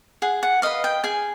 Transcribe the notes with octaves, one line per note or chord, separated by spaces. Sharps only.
G#4 F#5
F#5
B4 D#5 F5
G5
G#4 G#5